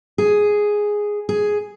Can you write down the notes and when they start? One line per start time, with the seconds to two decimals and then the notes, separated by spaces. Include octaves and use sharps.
0.18 G#4
1.29 G#4